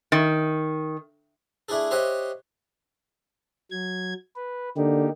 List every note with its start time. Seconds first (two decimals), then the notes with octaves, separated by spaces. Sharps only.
0.12 D#3
1.69 A3 D4 E4 G#4 A4
1.91 G4 C5 C#5 D#5 E5 F#5
3.71 F#3 G#6
4.36 B4
4.77 D3 A#3 D#4 G4